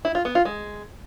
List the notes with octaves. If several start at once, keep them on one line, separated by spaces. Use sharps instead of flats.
E4
F4
B3
F4
G#3